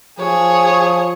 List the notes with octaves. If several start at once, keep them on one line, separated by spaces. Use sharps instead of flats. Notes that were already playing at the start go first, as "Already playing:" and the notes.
F3 G#4 C#5